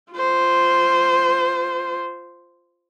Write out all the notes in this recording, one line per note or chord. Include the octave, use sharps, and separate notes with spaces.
F4 C5